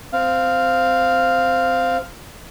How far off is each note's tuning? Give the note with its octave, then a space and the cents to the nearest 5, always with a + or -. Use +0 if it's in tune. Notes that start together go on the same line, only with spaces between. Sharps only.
C4 -10 F5 +0